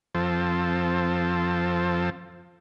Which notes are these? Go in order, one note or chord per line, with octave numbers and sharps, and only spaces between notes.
F2 F3 C4 A4